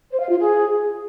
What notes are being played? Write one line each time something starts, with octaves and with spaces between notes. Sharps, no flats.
C5
F5
F4
G#4